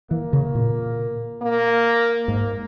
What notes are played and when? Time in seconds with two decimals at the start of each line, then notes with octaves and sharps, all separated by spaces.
0.11 E3 A#3
0.33 C#3
0.55 A#2
1.42 A#3
2.28 G#2 A#3